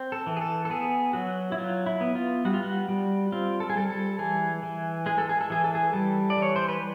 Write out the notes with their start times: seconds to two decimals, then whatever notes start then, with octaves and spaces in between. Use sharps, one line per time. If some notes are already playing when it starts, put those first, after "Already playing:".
Already playing: C4
0.12 A4
0.27 E3
0.37 G#4
0.41 A4
0.65 A4
0.70 B3 G#4
1.13 F#3 F#4
1.52 E4
1.58 F#3 F4
1.86 E4
2.01 B3
2.15 F4
2.45 G3 F#4
2.54 F4
2.63 F#4
2.88 G3
3.32 C4 F4
3.60 A4
3.70 G#4
3.76 G3 A4
3.90 A4
4.19 E3 G#4
4.63 E3
5.06 G#3 G#4
5.18 A4
5.29 G#4
5.41 A4
5.50 E3 G#4
5.64 A4
5.75 G#4
5.93 G3 A4
6.30 D5
6.37 E3 C#5
6.56 C5
6.69 B4